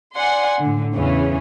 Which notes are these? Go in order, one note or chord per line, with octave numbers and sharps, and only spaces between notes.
D5 F#5 G#5 C6
A2 D3
E2 C#3 E3 C#4